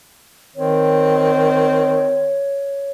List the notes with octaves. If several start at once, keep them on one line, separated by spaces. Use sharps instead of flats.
D#3 C4 C#5